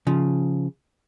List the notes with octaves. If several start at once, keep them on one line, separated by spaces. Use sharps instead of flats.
C#3 F3